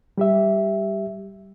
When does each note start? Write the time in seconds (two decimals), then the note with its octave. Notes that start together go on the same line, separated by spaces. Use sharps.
0.18 G3 G4 E5